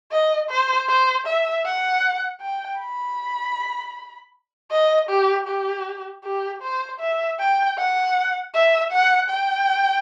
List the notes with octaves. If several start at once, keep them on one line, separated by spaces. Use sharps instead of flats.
D#5
C5
C5
E5
F#5
G5
B5
D#5
G4
G4
G4
C5
E5
G5
F#5
E5
F#5
G5